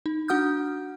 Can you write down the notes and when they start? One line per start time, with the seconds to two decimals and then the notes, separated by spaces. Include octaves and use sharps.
0.06 D#4
0.28 D4 F#4 F#5 D#6 F6 G6